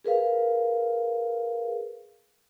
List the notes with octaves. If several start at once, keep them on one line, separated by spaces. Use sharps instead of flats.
G#4 A#4 B4 F5